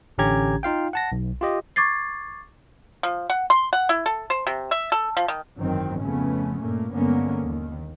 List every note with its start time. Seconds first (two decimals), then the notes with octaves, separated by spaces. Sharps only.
0.18 A1 D3 C#4 G4 A#5 G#6
0.63 D#4 F4 F5 G5
0.93 F#5 A5 A#6
1.12 B1
1.41 F4 G4 D#5
1.76 C#6 D6 G#6 A6 C7
3.03 F3
3.30 F#5
3.50 C6
3.73 F#5
3.89 E4
4.06 A4
4.30 C5
4.47 C3
4.71 E5
4.92 A4
5.17 F3
5.28 D#3
5.57 G#1 F#2 D#3 E3 F#3 C4
6.03 F2 C#3 A3 B3 C#4
6.61 G2 A#2 A3 A#3
6.93 G2 D3 G#3 A#3 B3 C#4
7.43 D#2 D#3